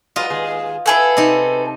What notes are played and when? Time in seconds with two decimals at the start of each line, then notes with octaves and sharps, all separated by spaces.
0.16 F#3 G#3 B3 F4 D#5
0.30 D#2 G#3 G#4
0.86 B3 E4 G#4 A4 B4
1.17 C3 D#4